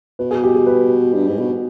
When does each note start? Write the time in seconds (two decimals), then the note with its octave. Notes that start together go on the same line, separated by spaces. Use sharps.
0.19 B2 B4
0.31 G#4
0.44 G4
0.55 G#4
0.66 B4
1.14 G2
1.27 G#2
1.39 B2